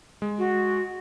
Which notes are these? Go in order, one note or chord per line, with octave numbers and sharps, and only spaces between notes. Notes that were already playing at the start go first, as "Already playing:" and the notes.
G#3
F#4